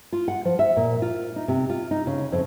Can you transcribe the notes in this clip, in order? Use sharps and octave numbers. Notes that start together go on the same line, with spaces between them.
F4
F#5
F3
E5
A#2
F4
D#4
C3
F4
D#4
C#3
F2